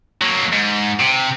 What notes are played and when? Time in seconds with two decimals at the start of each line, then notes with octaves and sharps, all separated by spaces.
0.22 F#3 A#3
0.53 G#2
1.00 C3